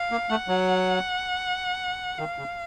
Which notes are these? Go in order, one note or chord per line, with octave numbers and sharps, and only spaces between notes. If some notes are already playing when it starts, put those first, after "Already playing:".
Already playing: F5
A#3
A3 F#5
F#3
D#3 F5
C#3